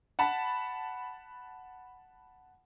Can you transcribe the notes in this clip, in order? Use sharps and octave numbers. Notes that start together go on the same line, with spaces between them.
F#5 A5 B5